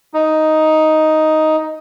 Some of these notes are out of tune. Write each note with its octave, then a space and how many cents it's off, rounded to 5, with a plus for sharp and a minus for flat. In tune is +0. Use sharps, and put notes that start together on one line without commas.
D#4 +5